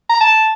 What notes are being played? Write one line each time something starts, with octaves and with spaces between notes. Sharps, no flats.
A#5
A5